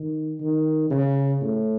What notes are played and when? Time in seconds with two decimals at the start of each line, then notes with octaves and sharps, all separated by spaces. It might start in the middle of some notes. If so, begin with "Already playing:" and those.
Already playing: D#3
0.40 D#3
0.91 C#3
1.42 A2